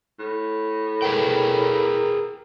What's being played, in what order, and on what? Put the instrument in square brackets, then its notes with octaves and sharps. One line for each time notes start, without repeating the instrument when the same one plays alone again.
[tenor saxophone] A2
[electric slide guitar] G#4 B4 G5 [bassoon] A#4